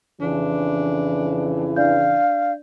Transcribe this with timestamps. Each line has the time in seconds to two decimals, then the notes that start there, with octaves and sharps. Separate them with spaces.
0.21 F2 C#3 E3 D4
1.76 D4 D5 F5 G6